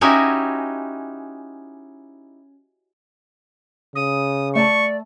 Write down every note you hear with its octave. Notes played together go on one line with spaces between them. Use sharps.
C#4 D#4 E4 F#4 G4 G#5
C#3 D#6
A3 D5 A5 C#6